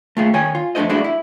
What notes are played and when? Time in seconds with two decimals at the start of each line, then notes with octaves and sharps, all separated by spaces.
0.17 A3 F4 G#4
0.34 D#3 C#5 G5 G#5
0.55 F4
0.75 F2 A3 D4 F#4 C5 D#5
0.89 G#3 A3 D4 E4 F#4
1.04 E4